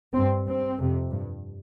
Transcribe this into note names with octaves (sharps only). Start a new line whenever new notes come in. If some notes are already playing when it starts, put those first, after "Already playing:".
G2 C4
G2 C4
F2 C3
G2